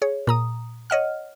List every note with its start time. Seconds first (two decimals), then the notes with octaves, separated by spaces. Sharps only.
0.02 G#4 C#5
0.27 A#2 A#5 D#6
0.90 C#5 D#5 F#5 F6